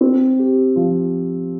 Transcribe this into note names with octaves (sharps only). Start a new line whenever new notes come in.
C4
G4
F3